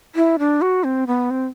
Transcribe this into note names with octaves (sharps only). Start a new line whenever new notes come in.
E4
D4
F#4
C4
B3
C4